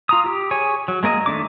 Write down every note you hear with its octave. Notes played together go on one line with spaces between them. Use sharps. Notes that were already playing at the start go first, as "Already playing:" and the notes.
F4 A#5 D#6
G4
G#4 C#5 G#5
F#3
G#3 A#3 A#4 D#5
D#3 A3 D4 D6